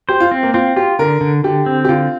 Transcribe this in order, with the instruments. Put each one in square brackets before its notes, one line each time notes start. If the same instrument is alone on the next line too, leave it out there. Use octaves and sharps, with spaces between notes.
[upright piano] G4 [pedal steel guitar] C5
[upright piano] F4
[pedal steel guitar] C4
[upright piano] A#3
[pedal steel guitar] C4 [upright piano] F4
[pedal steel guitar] F4 [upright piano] G4
[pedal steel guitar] D3 [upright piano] A#4
[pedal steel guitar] D3
[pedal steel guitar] D3 [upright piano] G4
[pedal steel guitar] C4
[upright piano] G4
[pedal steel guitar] D3 [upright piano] F4